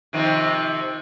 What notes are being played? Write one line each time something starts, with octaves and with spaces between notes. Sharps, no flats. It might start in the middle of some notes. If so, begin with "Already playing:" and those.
C3 D#3 F3